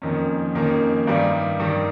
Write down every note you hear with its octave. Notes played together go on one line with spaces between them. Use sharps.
F2 D#3 A#3 C#4
F2 D#3 A#3 C#4
G2 D#3 G3
G2 D#3 G3